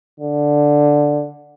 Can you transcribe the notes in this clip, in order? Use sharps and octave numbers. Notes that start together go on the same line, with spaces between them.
D3